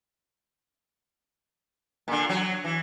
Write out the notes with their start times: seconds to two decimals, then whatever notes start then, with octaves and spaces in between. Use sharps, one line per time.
2.08 A#2 D3
2.29 F#3
2.64 E3